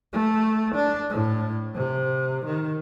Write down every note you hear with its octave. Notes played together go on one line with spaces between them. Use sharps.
A3
D4
A2
C3
D#3